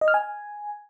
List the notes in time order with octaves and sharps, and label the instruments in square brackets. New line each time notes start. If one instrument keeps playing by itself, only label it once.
[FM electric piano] D#5
F6
G#5